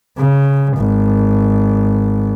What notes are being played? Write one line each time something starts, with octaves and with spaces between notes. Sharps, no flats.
C#3
G#1